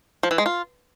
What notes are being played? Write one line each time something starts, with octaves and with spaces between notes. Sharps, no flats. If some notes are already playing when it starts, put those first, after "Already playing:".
F3
E3
G#3
F4